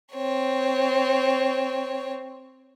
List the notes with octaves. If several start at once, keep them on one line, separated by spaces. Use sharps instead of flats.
C4 C#5